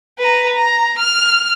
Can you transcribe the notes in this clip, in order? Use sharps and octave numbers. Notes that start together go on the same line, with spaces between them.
B4 A#5
A#5
F6